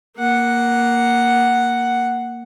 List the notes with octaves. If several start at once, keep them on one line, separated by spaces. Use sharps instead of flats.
A#3 F#5